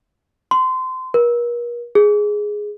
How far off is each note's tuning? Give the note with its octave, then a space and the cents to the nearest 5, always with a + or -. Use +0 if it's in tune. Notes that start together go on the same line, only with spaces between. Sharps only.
C6 -25
A#4 +40
G#4 +0